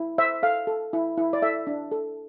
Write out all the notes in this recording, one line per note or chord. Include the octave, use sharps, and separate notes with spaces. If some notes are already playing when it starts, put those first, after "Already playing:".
Already playing: E4
C5 E5
A4 F5
A4
E4
E4
D5
A4 E5
D4
A4